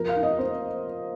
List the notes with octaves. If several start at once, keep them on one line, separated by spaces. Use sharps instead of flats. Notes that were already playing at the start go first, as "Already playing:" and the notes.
Already playing: F3 A#4
F5
D#4
D#5
C4 C5